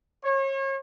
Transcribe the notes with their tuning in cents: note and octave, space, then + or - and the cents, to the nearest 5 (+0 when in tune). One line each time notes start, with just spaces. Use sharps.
C#5 -35